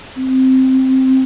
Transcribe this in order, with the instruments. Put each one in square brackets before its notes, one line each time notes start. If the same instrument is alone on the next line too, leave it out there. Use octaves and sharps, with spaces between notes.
[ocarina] C4